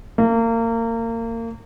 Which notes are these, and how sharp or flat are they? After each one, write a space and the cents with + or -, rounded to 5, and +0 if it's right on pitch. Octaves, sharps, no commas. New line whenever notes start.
A#3 -30